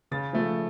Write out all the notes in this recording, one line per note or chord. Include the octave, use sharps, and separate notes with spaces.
C#3 A6
F3 A3